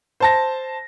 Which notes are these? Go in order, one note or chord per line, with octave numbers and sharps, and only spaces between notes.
C5 A5 A#6